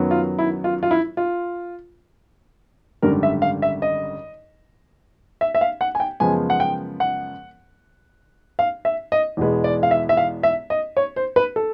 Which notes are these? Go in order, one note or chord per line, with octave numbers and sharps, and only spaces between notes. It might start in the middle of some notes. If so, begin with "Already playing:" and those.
Already playing: F#2 D#3 F#3 B3
F4
E4
F4
F4
E4
F4
G#1 F#2 D3 G3 A#4
E5
F5
E5
D#5
E5
E5
F5
F#5
G#5
G5
F#2 C#3 F3 G#3 B3 G#5
F#5
G5
F#5
F5
E5
D#5
E2 B2 G#3 B3
D5
F5
E5
E5
F5
E5
D#5
C#5
C5
B4
A4